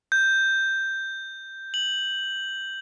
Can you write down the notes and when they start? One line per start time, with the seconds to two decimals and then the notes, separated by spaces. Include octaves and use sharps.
0.12 G6
1.74 F#7